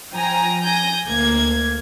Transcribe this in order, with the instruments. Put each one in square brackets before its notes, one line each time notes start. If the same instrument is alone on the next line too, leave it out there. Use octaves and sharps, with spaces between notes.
[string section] F3 G5 G#5 A#5
G#5 G6 A#6
D2 A#3 G#6